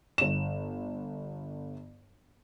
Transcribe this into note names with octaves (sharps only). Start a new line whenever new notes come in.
G1 E7